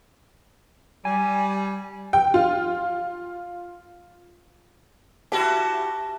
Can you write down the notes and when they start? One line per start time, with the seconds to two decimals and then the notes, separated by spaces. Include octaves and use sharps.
1.05 G3 G#5
2.13 G5
2.34 F4
5.32 E4 F#4 G4 A5